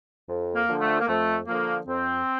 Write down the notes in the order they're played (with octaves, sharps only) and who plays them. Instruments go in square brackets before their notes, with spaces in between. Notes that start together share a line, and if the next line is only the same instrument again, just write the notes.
[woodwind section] F2
A#3
D3 F3
A3
A#3
F2 A3
D3 F3 A#3
F2 C4